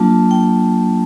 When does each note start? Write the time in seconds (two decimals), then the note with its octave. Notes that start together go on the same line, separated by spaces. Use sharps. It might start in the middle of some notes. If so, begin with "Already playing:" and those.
Already playing: F#3 A#3 D4 F4 A5
0.31 G5